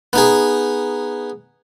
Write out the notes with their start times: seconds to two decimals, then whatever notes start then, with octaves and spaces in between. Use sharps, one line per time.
0.13 B3 D#4 G#4